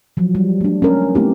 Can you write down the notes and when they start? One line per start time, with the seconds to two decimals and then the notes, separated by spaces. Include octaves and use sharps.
0.17 F3 F#3
0.35 G3
0.61 A3 D4
0.82 C#4 A#4
1.15 A3 B3 C4 D#4 E4 G4